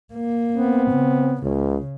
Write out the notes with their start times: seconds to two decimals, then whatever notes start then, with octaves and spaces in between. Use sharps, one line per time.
0.13 A#3
0.57 B3 C4
0.91 C#3
1.42 C#2 C#3